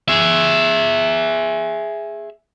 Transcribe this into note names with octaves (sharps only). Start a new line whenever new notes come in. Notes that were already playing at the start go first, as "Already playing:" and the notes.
G#4 E5